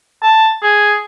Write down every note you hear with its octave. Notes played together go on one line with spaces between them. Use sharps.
A5
G#4